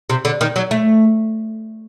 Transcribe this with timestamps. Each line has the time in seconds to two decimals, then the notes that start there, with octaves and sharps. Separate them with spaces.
0.10 C3
0.25 D3
0.41 D#3
0.56 F#3
0.71 A3